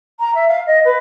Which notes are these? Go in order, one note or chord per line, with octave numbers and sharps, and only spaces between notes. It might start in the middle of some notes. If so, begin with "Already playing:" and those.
A#5
E5
F5
D#5
B4